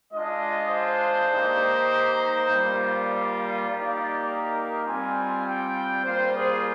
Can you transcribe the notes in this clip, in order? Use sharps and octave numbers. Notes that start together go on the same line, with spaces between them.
G#3 D4 F4 D#5
C5
A#3 D#4 G4
G3 A#3 F4
D5
A#3 D#4 G4 D5
A#4
G3 C4 F4 G#5
G5
G3 A#3 F4 C5
G#4